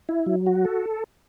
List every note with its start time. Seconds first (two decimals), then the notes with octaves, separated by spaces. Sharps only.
0.09 E4
0.26 F#3
0.46 F#4
0.65 A4